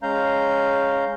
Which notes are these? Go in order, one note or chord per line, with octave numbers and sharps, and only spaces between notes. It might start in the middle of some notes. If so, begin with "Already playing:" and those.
G#3 C#4 F5 A#5 G6